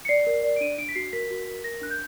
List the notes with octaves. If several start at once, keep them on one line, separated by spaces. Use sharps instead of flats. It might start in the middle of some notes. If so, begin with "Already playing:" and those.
C#7
D5 C7
A#4
D5
D7
D4 D#7
D4 D7
B6
F#4 C7
A#4 B6
F#4
A#4
A#4 A#6
D4 F#6
G6